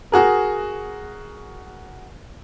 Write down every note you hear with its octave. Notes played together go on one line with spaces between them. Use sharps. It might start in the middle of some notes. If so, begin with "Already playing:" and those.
F#4 G#4 A#4